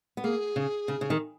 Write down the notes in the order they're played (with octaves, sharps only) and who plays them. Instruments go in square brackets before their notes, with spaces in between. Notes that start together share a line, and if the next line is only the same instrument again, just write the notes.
[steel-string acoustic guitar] B3
[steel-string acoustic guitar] A#3 [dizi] G#4
[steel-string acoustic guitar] C#3
C#3
C#3
D#3